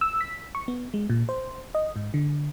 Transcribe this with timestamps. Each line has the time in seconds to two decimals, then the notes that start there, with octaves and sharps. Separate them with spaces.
0.01 E6
0.21 B6
0.55 C#6
0.68 B3
0.94 G#3
1.10 A#2
1.29 C5
1.75 D#5
1.96 G#2
2.14 D3